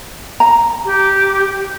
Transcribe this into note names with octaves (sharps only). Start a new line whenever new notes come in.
A#5
G4